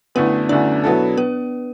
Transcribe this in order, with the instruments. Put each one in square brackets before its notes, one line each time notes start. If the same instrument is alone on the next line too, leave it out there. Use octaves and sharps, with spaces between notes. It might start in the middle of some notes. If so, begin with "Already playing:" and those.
[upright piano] F#2 D3 A3 E4 [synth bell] B3 B4
[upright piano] F#2 D3 A3 E4 [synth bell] D4 D5
[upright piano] B2 F#3 B3 E4 A4
[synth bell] B3 B4